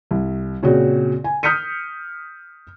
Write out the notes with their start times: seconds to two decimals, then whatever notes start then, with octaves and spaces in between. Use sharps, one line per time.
0.11 C2
0.63 A#2 C#3 C4 F#4
1.24 G#5
1.43 D#6 F6 G6 B6 C#7 D#7